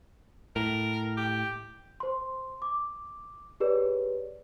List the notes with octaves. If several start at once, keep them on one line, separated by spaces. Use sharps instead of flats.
A2 A#4
G4
C5 C6
D6
G4 G#4 B4 C#5 D5